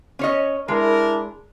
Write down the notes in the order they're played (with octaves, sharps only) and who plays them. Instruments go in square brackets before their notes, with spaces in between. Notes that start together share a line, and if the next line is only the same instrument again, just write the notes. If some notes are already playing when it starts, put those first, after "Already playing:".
[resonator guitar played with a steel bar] C#4 C#5 D#5
[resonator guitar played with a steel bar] G#3 [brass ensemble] D4 E4 A#4